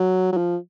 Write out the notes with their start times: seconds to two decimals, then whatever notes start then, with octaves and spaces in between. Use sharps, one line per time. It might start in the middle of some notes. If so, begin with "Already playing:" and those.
Already playing: F#3
0.32 F#3
0.37 F3